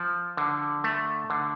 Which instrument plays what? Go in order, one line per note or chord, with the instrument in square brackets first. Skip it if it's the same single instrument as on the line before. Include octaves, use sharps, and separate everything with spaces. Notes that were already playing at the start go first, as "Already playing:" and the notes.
Already playing: [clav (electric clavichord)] F3
D3
A3
D3